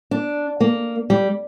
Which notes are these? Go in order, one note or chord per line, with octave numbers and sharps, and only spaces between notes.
D4
A#3
G3